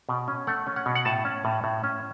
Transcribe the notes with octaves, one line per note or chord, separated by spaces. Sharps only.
B2
C#4
A3 F#5
C#4
F#5
B2
F#5
A2 A5
C#4
A2
A2
C#4